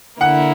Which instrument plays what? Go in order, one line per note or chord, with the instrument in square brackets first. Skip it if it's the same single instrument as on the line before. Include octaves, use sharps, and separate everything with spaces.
[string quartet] D3 A#3 E4 [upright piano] F#5